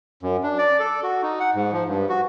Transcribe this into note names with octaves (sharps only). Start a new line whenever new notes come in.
F#2
D4
D5
A4
F#4
D#4
F#5
G#2
F3
G2
F#4